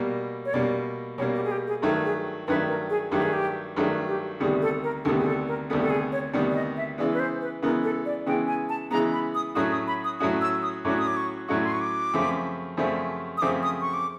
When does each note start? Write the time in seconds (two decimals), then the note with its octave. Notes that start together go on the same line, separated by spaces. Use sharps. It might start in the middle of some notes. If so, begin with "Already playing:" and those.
Already playing: B2 G3 A#3
0.45 C#5
0.54 B2 G3 A#3 D5
1.18 B2 G3 A#3 C#5
1.35 G4
1.44 G#4
1.51 G4
1.67 G#4
1.82 G2 D#3 F#3 A3 A4
2.05 G#4
2.48 G2 D#3 F#3 A3 B4
2.68 A#4
2.90 G#4
3.11 G2 D#3 F#3 A3 G4
3.22 G#4
3.33 G4
3.76 G2 D#3 F#3 A3 G#4
4.08 G4
4.40 D2 C3 D#3 G3 B3 G#4
4.62 A4
4.83 A#4
5.04 D2 C3 D#3 G3 B3 A4
5.19 G#4
5.26 A4
5.47 A#4
5.70 D2 C3 D#3 G3 B3 A4
5.81 A4
5.90 G#4
6.12 C#5
6.33 D2 C3 D#3 G3 B3 D5
6.50 D5
6.55 D#5
6.77 E5
6.98 C#3 E3 G#3 B3 D5
7.14 B4
7.20 C5
7.41 B4
7.62 C#3 E3 G#3 B3 A#4
7.83 A4
8.06 D5
8.26 C#3 E3 G#3 B3 G5
8.48 G#5
8.69 A5
8.91 C#3 E3 G#3 B3 A#5
9.13 B5
9.35 D#6
9.55 A2 F#3 A3 C#4 F#4 D#6
9.72 D#6
9.87 B5
10.04 D#6
10.20 A2 F#3 A3 C#4 F#4 D#6
10.41 E6
10.63 D#6
10.85 A2 F#3 A3 C#4 F#4 D6
10.98 D#6
11.07 D6
11.17 C#6
11.48 A2 F#3 A3 C#4 F#4 C#6
11.64 C6
11.72 C#6
11.81 D6
12.13 F#2 C#3 F3 A3 C4
12.77 F#2 C#3 F3 A3 C4
13.37 D#6
13.42 F#2 C#3 F3 A3 C4 D6
13.63 D#6
13.81 C#6
13.94 D6